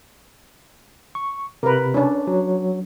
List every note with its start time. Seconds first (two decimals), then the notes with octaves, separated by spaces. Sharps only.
1.15 C#6
1.63 C3 A#4 B4
1.94 C#4 D4
2.27 F#3